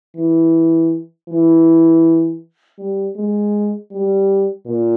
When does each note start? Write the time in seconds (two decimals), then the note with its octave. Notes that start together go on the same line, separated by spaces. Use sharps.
0.16 E3
1.29 E3
2.79 G3
3.16 G#3
3.91 G3
4.66 A#2